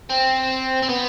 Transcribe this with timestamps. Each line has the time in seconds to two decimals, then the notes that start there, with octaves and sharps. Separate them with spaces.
0.10 C4
0.82 C4
0.89 B3